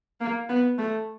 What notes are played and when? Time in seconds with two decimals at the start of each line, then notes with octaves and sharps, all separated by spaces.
0.21 A#3
0.49 B3
0.78 A3